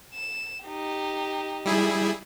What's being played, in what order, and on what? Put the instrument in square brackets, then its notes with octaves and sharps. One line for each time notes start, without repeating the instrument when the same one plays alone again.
[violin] E7
D#4 G4
[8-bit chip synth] G3 E4 G#4